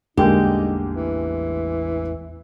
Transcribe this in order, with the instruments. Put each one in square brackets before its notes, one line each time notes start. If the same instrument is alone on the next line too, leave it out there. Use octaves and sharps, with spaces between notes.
[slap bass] A1 E2 G3 [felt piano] D3 G#3 A#3 [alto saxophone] D#4 [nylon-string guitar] G4
[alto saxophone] E3